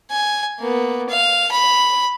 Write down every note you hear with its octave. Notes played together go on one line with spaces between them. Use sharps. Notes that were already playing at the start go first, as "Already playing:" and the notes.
G#5
A#3 B3
F5
B5